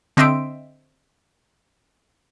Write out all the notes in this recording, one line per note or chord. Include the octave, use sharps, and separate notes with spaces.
D3 C4 D#5 E5 C6 D7